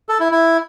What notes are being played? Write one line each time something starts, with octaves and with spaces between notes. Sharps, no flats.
A4
E4
E4